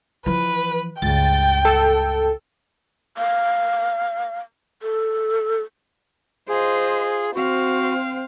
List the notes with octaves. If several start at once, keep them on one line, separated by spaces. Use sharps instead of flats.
E3 F3 B4
C#2 G2 G5 A6
A4
F5
A4
F4 G#4 C5 D#5
C4 F#4 C5 F5